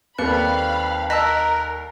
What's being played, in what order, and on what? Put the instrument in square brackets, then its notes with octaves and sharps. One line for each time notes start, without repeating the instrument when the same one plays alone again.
[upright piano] D#2 G3 A4 [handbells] C4 B4 F#6 [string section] F5 B5
[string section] A#4 [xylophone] D#5 A5 E6 [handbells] A#5 F#6 B6